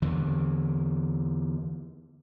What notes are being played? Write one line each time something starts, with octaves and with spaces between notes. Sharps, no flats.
E2 D3 E3